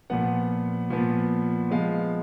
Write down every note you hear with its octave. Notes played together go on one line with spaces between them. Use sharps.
A#2 F3 B3 F#5
A#2 F3 B3
F3 G#3 B3 F5